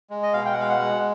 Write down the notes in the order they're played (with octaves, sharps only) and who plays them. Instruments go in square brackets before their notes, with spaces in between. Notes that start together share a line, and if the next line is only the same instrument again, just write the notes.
[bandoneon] G#3
D#5
B2 F5
G5
F#5
G#3 F5
F#5
G#3